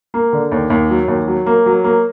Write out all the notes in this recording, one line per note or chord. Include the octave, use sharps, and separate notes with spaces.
A#3
D3
D#2
D#2
F#3
D#2
F#3
A#3
F#3
A#3